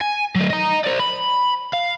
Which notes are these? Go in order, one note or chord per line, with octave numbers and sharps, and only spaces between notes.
G#5
F#3 A3
D#5 A#5
C5 D5
B5
F5